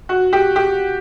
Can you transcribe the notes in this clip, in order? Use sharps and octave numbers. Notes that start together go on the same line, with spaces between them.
F#4
G4
G4